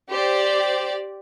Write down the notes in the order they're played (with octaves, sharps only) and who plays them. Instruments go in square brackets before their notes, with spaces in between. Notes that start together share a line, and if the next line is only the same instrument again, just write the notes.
[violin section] G4 C5 D5